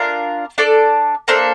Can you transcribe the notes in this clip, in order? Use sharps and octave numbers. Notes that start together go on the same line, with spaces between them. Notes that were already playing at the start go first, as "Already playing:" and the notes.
Already playing: D4 F4 A#4
D4 A4 D5
A#3 D4 A4 C5